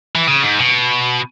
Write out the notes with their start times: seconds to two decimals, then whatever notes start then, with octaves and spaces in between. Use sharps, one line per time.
0.15 E3
0.27 C#3
0.43 G#2
0.60 B2